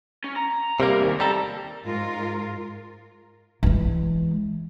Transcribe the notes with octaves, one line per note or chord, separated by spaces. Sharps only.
C#4
A#5
C3 G3 A#3 A#4
D#2 C#3
G3 A4 A#5
G#2 F4 A#4
E3 G#3